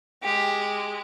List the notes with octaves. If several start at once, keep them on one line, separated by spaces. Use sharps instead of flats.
G#3 G4